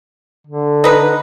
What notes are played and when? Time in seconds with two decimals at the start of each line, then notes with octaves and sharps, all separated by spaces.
0.47 D3
0.84 D#4 B4